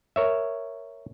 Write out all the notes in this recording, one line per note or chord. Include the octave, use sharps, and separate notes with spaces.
A#4 C#5 E5